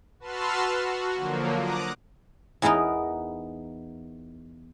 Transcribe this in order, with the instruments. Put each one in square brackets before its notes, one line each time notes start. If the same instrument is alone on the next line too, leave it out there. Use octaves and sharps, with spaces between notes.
[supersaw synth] F#4 B4 A5 C6 E6 F6
F#4
D3 F3 F#3 A#3
A#5 D6 D#6 F#6
[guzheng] E2 E3 B3 D#4 A#4